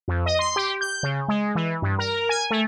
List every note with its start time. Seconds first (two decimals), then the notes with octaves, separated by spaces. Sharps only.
0.08 F2
0.26 D#5
0.39 C6
0.56 G4
0.81 G6
1.03 C#3
1.28 G#3
1.55 E3
1.82 G2
1.99 A#4
2.29 G#5
2.51 A3